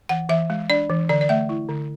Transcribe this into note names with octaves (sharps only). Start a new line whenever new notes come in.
E3 F#5
E3 E5
G#3
D4 D5
E3
D3 D5
D5
A3 E5
E4
D3